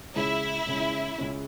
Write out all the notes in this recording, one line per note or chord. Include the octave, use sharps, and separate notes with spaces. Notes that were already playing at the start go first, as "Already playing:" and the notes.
C#2 C#3 G#3 C#4 E4
C#2 C#3 G#3 C#4
C#2 C#3 G#3 C#4